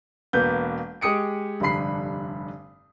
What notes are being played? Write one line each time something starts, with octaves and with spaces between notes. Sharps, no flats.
E1 A#3 B3 B4 G6
G#3 G4 D#6 C#7 D7
F1 G2 D3 B5 C7